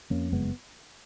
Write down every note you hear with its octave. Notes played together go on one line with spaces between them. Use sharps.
F2 A#3 C#4
F#1 G#3 B3